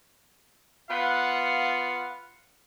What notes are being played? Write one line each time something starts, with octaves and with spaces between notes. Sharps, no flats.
B3 F4 B4 F5 F#5